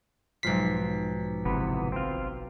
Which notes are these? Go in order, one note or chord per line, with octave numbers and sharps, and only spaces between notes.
B1 G#2 F3 B6 C7
G1 C3 E3 B3
C4 F4